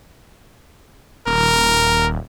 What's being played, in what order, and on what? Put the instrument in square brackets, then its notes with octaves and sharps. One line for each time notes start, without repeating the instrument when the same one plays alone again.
[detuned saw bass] D#1 [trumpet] A#4